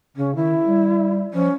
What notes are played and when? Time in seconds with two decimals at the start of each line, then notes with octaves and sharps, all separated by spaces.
0.16 C#3 C#4
0.35 D#3 E4
0.65 G3
1.34 F3 C#4